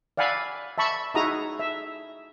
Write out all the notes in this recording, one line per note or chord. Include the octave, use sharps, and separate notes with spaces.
D5 F5 F#5 G#5 B5 E6
E5 A5 B5 C#6
D#4 E4 F#4 G#4 A#5 D#6
E5